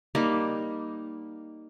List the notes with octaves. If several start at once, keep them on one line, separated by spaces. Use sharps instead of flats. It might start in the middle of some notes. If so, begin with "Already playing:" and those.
G3 A#3 D#4